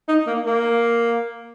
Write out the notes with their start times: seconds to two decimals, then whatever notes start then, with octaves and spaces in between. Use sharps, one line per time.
0.08 D#4
0.27 A#3
0.46 A#3